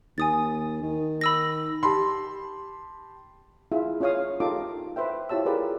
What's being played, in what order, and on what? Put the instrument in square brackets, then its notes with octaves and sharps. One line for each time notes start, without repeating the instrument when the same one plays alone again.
[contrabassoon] D#2 [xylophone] G#5 D#6 A6
[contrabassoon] D#3
[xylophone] B5 E6 A#6
[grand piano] G4 A5 B5 C6
[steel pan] E4 F4 G#4 E5
C#4 F4 G#4 C#5 F5 D#6
D#4 F4 G4 A4 D6
B4 C5 E5 G5
E4 F4 G4 C#5 A5 E6
F4 G4 G#4 A#4 B4 D5